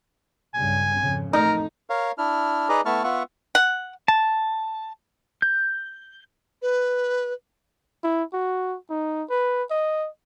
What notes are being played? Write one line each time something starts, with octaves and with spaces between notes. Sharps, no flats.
B1 G2 C#3 G#5
F2 G#2 C#3
A1 F2 A3 D#4 A#4
A#4 C#5 F5
D4 E4 F6
D#4 G#4 B4 D5 A#5
A3 B3 E4 A5 C#6 F6
B3 F4 E5 F#5 C#6
F#5
A5
G6
B4
E4
F#4
D#4
B4
D#5